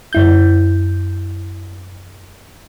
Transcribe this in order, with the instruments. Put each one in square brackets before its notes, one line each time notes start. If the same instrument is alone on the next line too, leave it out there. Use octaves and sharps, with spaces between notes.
[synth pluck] F#2 E4 G6